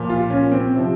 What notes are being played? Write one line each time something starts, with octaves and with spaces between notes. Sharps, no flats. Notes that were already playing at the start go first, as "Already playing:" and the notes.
Already playing: A#2 F3
F4
C#4
C4
C3 F3